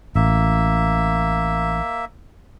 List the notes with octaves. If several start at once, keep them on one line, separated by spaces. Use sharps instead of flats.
A1 A#3 E5